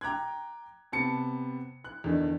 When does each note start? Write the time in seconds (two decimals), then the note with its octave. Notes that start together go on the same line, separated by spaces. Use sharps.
0.01 G5 A#5 D6 F#6 G#6
0.92 C3 B3 A5 C#7
1.85 F#6
2.04 E2 D3 D#3 D4 D#4